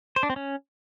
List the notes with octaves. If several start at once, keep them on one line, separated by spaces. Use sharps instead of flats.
C5
D4
C4
C#4